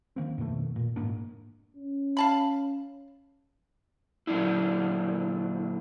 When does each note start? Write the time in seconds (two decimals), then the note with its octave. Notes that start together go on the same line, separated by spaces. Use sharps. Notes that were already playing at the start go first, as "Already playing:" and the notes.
0.16 D#3 A#3 C4
0.38 F2 B2 D#3 A3
0.76 A#2
0.96 F1 G#2 A#3 D4
1.77 C#4
2.17 F5 A5 B5
4.27 A#2 D3 F#3 C4 D4 E4